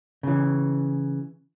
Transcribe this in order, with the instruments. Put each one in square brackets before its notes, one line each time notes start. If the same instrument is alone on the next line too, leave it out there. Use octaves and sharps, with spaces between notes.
[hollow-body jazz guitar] C#3 E3